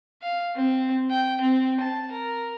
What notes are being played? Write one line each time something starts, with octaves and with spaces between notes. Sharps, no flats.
F5
C4
G5
C4
A5
A#4